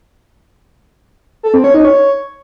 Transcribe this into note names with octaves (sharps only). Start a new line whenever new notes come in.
A4
C4
C#5
D#4
C#5